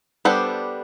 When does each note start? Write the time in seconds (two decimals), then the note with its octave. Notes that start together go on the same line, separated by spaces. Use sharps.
0.25 G3 B3 D4 A4 C5